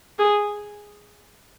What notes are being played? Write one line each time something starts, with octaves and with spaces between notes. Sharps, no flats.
G#4